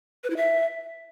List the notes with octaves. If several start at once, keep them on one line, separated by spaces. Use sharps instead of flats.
B4
E4
E5